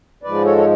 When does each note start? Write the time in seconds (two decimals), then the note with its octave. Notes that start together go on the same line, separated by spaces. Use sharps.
0.23 G#2 F3 G#3 B4 D5
0.45 A4 C#5
0.58 C#5